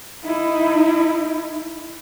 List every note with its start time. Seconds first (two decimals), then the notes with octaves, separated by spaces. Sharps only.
0.24 D#4 E4